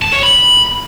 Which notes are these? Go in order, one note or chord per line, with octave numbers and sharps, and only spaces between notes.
A5
C#5
B5